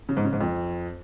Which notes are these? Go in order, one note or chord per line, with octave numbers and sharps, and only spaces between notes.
C#3
G#2
C#3
G#2
F2